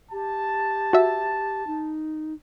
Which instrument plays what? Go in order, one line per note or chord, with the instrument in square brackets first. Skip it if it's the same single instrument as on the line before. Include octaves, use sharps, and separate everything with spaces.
[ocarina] G4 [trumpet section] A5
[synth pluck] F#4 E5
[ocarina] D#4